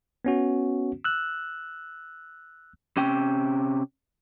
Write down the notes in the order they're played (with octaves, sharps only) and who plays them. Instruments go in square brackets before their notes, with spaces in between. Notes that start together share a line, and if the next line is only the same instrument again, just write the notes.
[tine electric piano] B3 C#4 F#4
E6 F#6
[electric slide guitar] C3 C#4 G5